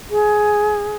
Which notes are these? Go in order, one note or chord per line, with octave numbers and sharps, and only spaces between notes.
G#4